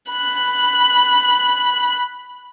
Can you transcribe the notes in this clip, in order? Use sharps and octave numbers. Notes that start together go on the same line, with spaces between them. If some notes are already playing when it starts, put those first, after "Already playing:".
B5 F#6